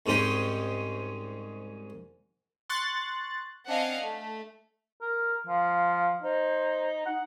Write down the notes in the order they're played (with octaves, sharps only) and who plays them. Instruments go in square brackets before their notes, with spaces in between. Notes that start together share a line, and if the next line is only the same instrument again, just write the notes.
[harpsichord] C2 G#2 G#3 C#4 G4
[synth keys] C6 C#6 F#6 A6
[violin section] C4 D4 D#5 F5 F#5 G#5
A3
[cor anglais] A#4
[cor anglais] F3 [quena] F5
[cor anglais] D#4 [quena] C5
[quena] D#4 [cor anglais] F#5